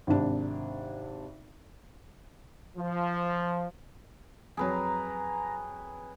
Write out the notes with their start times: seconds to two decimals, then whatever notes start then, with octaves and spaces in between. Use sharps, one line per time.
0.07 G#1 C3 D4
2.77 F3
4.57 F2 F#3 G#4 B4 A#5